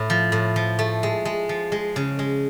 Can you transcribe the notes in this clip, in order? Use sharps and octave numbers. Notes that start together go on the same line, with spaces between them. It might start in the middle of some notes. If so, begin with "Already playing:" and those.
Already playing: A2
F3
A2
F3
A3
G#3
G#3
F3
G#3
C#3
G#3